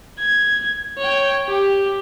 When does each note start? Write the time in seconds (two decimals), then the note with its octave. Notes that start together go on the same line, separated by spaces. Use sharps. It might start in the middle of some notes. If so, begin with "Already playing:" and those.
0.19 G#6
0.98 C#5 G5
1.47 G4